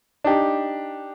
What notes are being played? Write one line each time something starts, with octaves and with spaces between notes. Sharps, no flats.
D4 D#4 G4